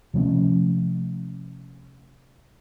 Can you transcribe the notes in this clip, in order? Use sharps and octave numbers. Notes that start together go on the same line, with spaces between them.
C3 F3 A3 C#4